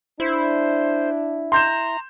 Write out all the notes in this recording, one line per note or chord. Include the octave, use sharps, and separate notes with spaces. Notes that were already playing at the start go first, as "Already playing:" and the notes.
D4 E4 C5
A#5 C6 G6 E7